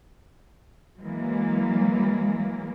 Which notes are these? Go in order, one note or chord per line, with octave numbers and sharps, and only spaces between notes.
E3 F#3 G#3 A#3